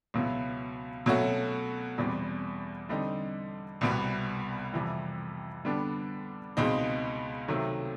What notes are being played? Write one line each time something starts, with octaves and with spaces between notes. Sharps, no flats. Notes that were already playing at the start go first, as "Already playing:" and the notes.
C#2 B2 F#3 B3 E4
B2 F#3 A3 C#4 F#4
E2 B2 G3 C4
D3 G3 C4 D#4
C2 B2 G3 B3
F2 C3 E3 G3
D3 G3 B3 D4
C#2 B2 G#3 C4 D#4
C3 D#3 F#3 A3